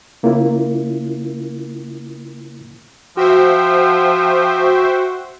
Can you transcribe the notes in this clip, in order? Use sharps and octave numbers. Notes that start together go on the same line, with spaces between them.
C#3 A#3 C#4 E4 F4 A#4
F3 F#4 C5 E5 G5